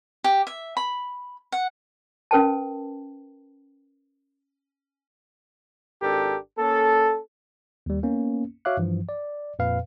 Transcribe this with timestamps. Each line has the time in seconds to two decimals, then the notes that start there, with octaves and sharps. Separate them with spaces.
0.24 G4
0.47 E5
0.77 B5
1.52 F#5
2.31 C#4 A#4 B4 G5 A5
6.02 G#1 D4 G4 A4 A#4
6.59 A#3 C#4 A4
7.86 D#2 G3
8.03 A#3 B3 C#4
8.65 F#4 C#5 E5 F5 D6 F#6
8.77 G2 E3 F3
9.09 D5
9.59 F2 A#2 B4 F5